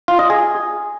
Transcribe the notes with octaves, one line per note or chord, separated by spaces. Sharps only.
F4
D#5
G#4